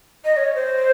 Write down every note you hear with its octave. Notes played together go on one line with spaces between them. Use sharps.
D#5
C#5
C5